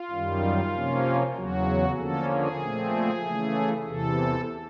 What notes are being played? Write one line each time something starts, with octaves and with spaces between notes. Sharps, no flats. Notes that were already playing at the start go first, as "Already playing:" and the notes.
Already playing: F4
F#2 D#3 G3
C3 F3 A#3 C#4
E2 C#3 F#3 F#4
D3 F3 A#3 C#4 A4
G#4
A#2 F3 A3 C4
C#3 E3 A3
E2 C3 E3 A4